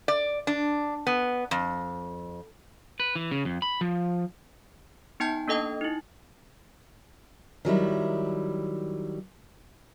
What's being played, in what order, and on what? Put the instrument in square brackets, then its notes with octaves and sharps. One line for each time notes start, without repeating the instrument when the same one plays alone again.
[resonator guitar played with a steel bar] D5
D4
B3
F2
[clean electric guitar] B4
E3
C#3
F2
B5
F3
[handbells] B3 D#4 G5 A5 G6
A#3 D4 A4 D#5 G5 D#6
D#4 E4
[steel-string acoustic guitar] D#3 F#3 G3 E4